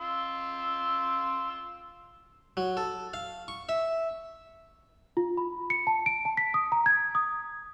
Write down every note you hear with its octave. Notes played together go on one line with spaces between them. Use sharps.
F4 C6 E6
F#3
A4
F5
C#6
E5
F4
B5
C#7
A5
D7
A5
B6
D#6
A#5
G#6
D#6